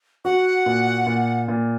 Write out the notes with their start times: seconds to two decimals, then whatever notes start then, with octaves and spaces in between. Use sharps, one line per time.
0.25 F#4 F#5
0.66 A#2
1.07 A#2
1.48 A#2